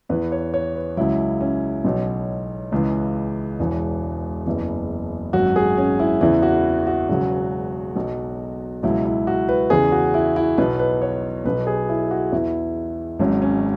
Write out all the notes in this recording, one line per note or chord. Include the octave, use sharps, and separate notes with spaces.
E2 E3 B4
C#5
C#5
B4
C#2 C#3 F#3 E4
C#4
B1 B2 F#3
C#2 C#3 E3
E1 E2 E3
F#1 E2 E3
G#1 F#2 F#3 F#4
G#4
C#4
E4
E2 C#3 E3 E4
F#4
F#4
E1 E2 C#3 F#3
B1 B2 F#3
C#2 B2 F#3 E4
E4
F#4
B4
E2 C#3 E3 G#4
F#4
E4
E4
B1 B2 F#3 B4
B4
B4
C#5
B1 B2 F#3 B4
G#4
E4
F#4
E2 E3 E4
G#1 G#2 F#3 C#4
C#4